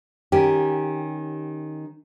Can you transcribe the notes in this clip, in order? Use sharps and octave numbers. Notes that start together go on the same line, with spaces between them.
D#3 C#4 G4